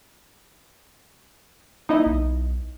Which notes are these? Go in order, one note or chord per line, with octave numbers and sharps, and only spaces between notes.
A#3 D#4 E4 D#5
B1